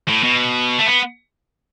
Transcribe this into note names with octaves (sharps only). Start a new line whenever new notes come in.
A2
B2
A3
B3